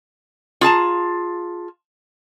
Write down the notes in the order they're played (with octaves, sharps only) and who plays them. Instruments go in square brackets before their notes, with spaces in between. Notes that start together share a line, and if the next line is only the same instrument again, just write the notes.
[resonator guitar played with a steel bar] F4 G#4 A5 A#5